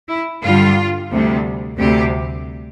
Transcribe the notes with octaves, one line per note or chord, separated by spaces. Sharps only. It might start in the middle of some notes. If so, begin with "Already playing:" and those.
E4
G2 D3 G3 F4
D2 C3 G3
D2 C3 G3 G4